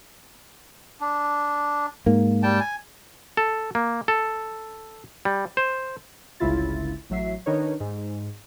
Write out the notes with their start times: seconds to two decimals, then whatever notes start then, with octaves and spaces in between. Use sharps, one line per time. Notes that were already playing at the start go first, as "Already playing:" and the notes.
1.00 D4
2.06 G#2 A#3
2.43 G3 G5 A5
2.60 G#5
3.37 A4
3.75 A#3
4.08 A4
5.25 G3
5.57 C5
6.40 G1 C#2 C#3 E4 F4 A6
7.10 A1 F#3 E5 C7
7.46 D#3 D4 D#4 A#4 B4 C#5
7.80 G#2